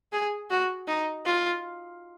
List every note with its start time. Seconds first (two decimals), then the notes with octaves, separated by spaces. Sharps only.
0.12 G#4
0.50 F#4
0.88 D#4
1.26 F4